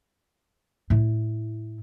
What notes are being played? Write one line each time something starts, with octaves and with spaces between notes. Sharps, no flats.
A2 E4